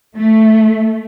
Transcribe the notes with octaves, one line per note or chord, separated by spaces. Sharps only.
A3